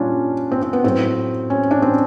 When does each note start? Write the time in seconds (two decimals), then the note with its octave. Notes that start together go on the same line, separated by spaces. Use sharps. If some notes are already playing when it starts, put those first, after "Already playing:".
Already playing: A#2 G3 C#4 D4 F4
0.52 C4
0.62 C4
0.73 B3
0.84 A2 F#3 C4
1.50 C#4
1.71 D4
1.82 C4